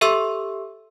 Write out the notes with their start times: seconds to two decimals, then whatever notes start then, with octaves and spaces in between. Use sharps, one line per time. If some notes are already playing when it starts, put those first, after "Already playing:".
0.01 G4 A4 E5 C6 C#6 E6